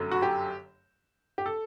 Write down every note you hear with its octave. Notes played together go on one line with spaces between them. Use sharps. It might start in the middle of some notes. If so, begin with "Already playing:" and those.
Already playing: G1 F#2 D3 F#3 A3
F#4
G4
G4
A4